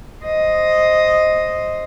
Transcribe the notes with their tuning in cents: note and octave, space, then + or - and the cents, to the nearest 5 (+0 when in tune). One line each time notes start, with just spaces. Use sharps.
C5 +0 D#5 +0